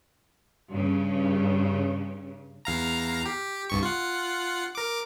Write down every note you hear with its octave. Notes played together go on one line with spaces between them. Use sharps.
G2 C#3
E2 F5 A#5
G4
C2 G2 C#6
F4 F#5
A#4 D6